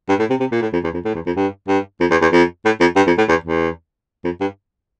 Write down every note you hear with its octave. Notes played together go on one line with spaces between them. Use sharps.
G2
A2
C3
C3
A#2
A2
F2
E2
F2
A2
E2
F2
G2
G2
F2
E2
E2
F2
A2
F2
G2
F2
A2
E2
E2
F2
G2